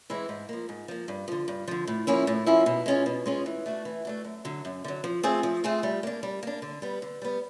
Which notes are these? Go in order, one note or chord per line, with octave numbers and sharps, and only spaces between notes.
E3 G#3 C4 E4
G#2
F3 A#3
G#2
F3 A#3
G2
D3 F3
G2
D3 F3
A2
F3 A#3 C#4 E4
A2
F3 A#3 C#4 E4
B2
G#3 C#4 F4 G#4
B2
G#3 C#4 F4 G#4
E3
A3 D4 F#4
E3
A3 D4 F#4
F#2
D3 F#3
F#2
D3 F#3
F3
A3 C4 F4 G#4
F3
A3 C4 F4 G#4
G3
A#3 D4
G3
A#3 D4
D3
G3 B3
D3
G3 B3